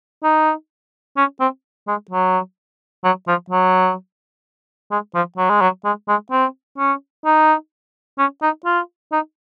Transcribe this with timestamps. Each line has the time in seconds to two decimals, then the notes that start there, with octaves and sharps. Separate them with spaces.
0.24 D#4
1.17 C#4
1.40 C4
1.87 G#3
2.10 F#3
3.04 F#3
3.27 F3
3.50 F#3
4.91 G#3
5.15 F3
5.38 F#3
5.50 G#3
5.61 F#3
5.85 G#3
6.08 G#3
6.31 C4
6.78 C#4
7.25 D#4
8.18 C#4
8.42 D#4
8.65 F4
9.12 D#4